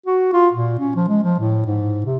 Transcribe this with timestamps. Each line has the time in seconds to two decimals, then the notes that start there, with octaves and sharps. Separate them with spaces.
0.06 F#4
0.33 F4
0.53 A#2
0.79 C#4
0.96 F3
1.08 G#3
1.23 F3
1.39 A2
1.66 G#2
2.06 C3